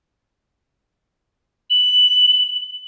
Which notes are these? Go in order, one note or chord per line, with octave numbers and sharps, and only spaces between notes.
F#7